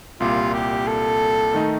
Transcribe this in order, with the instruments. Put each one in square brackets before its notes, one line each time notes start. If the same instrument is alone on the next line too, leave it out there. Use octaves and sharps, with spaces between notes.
[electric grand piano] C2 A#2 G3 [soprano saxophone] F4
[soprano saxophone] G4
A4
[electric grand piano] D#3 A3 D#4